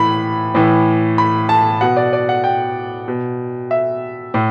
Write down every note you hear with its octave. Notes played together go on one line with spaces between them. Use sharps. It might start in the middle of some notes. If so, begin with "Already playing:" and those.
Already playing: A2 E3 B5
A2 E3
B5
A5
B2 F#5
D5
D5
F#5
G5
B2
E5
A2